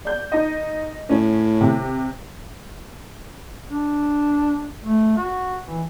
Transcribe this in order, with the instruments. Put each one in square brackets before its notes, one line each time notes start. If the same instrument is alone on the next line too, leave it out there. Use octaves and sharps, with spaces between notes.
[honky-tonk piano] D5 G6
D#4 D#5
[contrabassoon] A2 [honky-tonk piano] C#4
[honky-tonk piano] C3
[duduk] D4
A3
F#4
E3